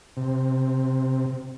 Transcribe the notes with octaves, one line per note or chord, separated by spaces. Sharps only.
C3